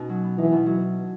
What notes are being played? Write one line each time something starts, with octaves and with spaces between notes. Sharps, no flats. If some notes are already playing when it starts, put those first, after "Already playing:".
Already playing: B2 C#4 D#4 F#4
F#3
B3
E3 D#4
B2
F#3